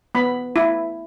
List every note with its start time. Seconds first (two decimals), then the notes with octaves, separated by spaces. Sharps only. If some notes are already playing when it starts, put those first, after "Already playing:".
0.15 B3 B5
0.56 E4